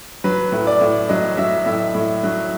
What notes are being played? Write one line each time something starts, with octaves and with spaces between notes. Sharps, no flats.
F#3 B4
A2
D5
A2
F#3 D#5
F#3 E5
A2 E5
A2
F#3